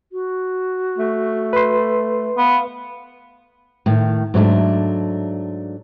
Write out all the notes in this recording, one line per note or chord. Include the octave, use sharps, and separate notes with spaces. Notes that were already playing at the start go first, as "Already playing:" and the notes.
F#4
A3
B4 C6
B3 F5
A2 D#3
G#2 F#3 A3 D4